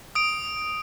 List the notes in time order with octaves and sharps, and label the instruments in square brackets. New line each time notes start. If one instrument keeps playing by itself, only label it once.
[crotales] D#6 D7